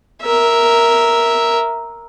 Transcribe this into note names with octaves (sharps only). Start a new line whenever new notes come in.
A#4 E5